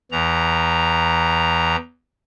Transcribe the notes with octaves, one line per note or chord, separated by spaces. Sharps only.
E2 E3 A#5